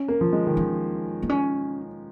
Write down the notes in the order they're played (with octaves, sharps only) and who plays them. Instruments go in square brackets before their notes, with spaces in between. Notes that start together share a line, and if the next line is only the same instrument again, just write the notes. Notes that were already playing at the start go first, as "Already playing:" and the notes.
Already playing: [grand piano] C#4
A#3
F3
G#3
D#3
[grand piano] F3 [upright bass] C#4
[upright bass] A#3
C#4